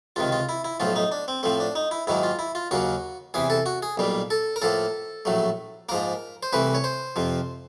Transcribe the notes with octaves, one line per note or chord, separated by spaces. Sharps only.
C#2 C3 D#3 F4
F4
E4
E4
B1 A2 F3 A3 F4
D#4
D4
C4
A2 F3 A3 C4
D4
D#4
E4
G#2 D#3 F#3 A#3 E4
F4
E4
F4
D#2 C#3 F#3 A#3 F#4
E2 C3 E3 G#4
A4
F#4
G#4
B1 A#2 G3 A#3
A4
A#4
A2 F3 A#3 A4
A#1 A2 F#3 A3
G#2 F3 A#3 A#4
C5
C2 C3 E3 A3 B4
C#5
C5
F2 C3 F3